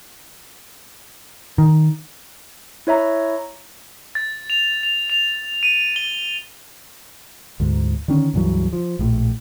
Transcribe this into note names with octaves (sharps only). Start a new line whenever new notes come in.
D#3
E4 C#5 E5 A#5
A6
F7
F7
F7
D#7
G7
D2 G#2
D3 D#3 C#4
C#2 G2 E3 F#3
F3
A#1 A2